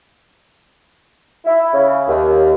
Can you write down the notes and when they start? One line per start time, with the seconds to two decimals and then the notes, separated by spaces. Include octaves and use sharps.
1.45 E4
1.74 C#3
2.08 D#2